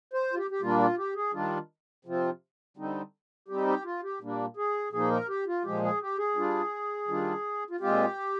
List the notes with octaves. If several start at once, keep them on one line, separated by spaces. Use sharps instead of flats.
C5
F4
G4
G4
A#2 G3 A#3 D4 F4
F4
G4
G#4
D#3 G3 D4 F4
C3 F3 C4 F4
D3 G3 C4 D#4
G3 C4 D#4 G4
G4
F4
G4
A#2 G3 A#3 D4
G#4
A#2 F3 A#3 D#4 G#4
A#4
G4
F4
A#2 F3 G#3 G4
G#4
G4
G#4
G3 D4 F4
D#3 G3 D4 F4
F4
A#2 G#3 C4 F4 G4